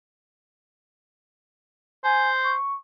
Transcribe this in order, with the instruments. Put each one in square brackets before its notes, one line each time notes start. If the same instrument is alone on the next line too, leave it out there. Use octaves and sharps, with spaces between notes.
[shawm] C5 [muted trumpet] G#5
[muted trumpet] C#6